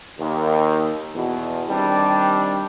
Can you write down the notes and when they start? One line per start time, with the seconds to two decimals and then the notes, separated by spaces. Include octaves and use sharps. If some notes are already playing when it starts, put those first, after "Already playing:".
0.18 D#2
1.15 E2 B2
1.69 D#3 G3 C4 D4